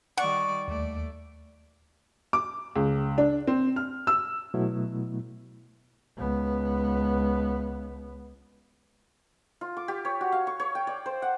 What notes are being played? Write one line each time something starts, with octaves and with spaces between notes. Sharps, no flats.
D#3 G3 D5 F#5 C#6
D#2 A3 D5
D6
C#2
D4
C4
F6
E6
B2 F#3 A3 B3 E4
C#2 B3
F4
D6
G4
C#5
F#4
F5
C#6
C#5
G5
D5
C5
F#5